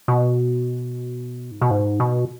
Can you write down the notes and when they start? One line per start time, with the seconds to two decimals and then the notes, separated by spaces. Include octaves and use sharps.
0.08 B2
1.51 G#2
1.62 B2
1.71 G#2
2.00 B2